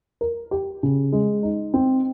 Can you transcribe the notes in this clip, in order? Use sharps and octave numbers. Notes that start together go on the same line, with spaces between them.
A#4
G4
C#3
G#3
D#4
C4